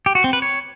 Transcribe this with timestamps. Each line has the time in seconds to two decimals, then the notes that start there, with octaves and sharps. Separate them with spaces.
0.06 G4
0.15 F#4
0.24 C4
0.33 B4
0.42 C#5